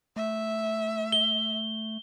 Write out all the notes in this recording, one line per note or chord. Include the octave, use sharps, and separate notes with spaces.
A3 E5
G7